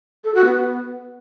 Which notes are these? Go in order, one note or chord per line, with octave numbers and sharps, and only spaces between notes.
A4
F#4
B3